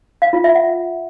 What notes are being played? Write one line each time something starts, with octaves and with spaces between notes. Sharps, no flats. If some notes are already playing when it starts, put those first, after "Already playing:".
F5
F4
E5
F#5